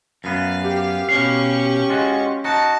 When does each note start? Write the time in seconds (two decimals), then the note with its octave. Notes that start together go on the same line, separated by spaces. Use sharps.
0.24 F#2 B3 F5
0.63 G4
1.09 B2 C#4 F5 C#6
1.89 G#3 F4 F#4
2.44 D#4 F#4 A5